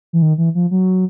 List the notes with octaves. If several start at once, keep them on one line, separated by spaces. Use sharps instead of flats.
E3
D#3
E3
F3
F#3